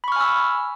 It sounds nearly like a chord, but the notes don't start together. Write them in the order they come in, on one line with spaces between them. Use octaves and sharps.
B5 C#6 F6 G#5 E6